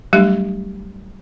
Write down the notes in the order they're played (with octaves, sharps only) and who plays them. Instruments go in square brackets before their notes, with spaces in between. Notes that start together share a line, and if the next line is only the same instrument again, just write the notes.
[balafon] F#3 G3 A3 D4 G4